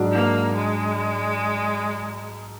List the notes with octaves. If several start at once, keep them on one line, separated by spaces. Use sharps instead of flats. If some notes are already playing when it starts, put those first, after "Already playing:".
Already playing: G#2 F#3 D4 F#4 D5
A#3
G#3